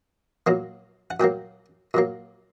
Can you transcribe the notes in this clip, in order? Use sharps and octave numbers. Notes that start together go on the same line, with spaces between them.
A#2 F#3 A#3
F#5
A#2 F#3 A#3 G5
A#2 F#3 A#3